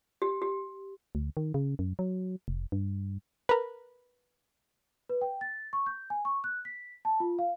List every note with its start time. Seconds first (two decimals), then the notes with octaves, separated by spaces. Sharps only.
0.22 G4
0.42 G4
1.15 D2
1.37 D#3
1.54 C#3
1.79 F#2
1.99 F#3
2.48 F1
2.72 G2
3.49 A#4 B4
5.09 B4
5.21 G5
5.41 A6
5.73 C#6
5.86 G6
6.10 G#5
6.25 C#6
6.44 F#6
6.65 B6
7.05 A5
7.20 F4
7.39 F5